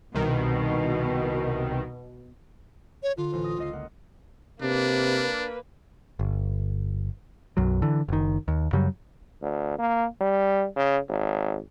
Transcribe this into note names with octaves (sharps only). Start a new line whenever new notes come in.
C2 B2 D#3
C#5
D3 F4
A1 C5
D#6 A#6
C#2 D#5 C7
A#3 F#5
C3 A#3 D4 B4
G1
B1 F#2 F#3
D3 E3
F#1 D#3
D#2
F#2 C#3 F#3 G3
D2
A#3
G3
C#3
G#1